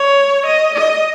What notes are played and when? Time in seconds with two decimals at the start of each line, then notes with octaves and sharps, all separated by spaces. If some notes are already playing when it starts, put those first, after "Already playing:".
Already playing: C#5
0.46 D#5
0.74 D#5